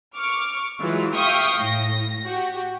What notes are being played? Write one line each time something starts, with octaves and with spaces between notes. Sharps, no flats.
C#6 D6 F6
E3 F#3 G#3 F4
E5 F5 G5 C#6 D#6
A2 A#6
F#4 G4